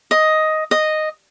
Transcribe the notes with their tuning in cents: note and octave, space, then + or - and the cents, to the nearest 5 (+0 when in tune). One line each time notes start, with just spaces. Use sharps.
D#5 +5
D#5 -5